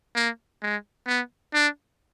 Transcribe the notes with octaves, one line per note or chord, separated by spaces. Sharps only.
A#3
G#3
B3
D4